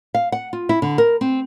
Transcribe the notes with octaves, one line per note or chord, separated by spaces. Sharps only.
F5
F#5
F4
E4
D3
A#4
C4